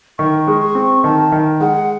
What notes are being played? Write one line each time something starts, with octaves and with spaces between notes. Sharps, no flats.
D#3 C#6
G#3
C#6
C4
D#3 A5
D#3
G#3 F#5